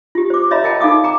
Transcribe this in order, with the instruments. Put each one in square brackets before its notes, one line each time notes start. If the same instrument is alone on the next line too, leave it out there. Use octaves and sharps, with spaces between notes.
[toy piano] F4 G4
C5 D6
C#5 D#5 E5 A#5 B5
A#4 D#5 F#5 G5 A5 B5
D#4 A4 F5 D6 D#6
G5 A#5 D6